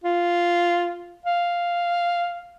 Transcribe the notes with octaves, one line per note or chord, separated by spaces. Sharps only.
F4
F5